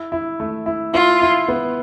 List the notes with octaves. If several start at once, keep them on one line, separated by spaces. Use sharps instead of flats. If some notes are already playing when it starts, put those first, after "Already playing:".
Already playing: E4
E4
A3
E4
E4 F4
E4
B3